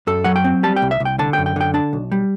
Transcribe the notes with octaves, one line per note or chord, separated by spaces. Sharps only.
F#2 A4
F#3 F#5
G5
C4
G3 A5
G5
C2
E5
C2
G5
D3 A5
G5
F#2
G5
D3 G5
D4 A5
B1
G3